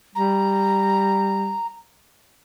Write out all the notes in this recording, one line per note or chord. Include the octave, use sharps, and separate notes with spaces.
G3 A#5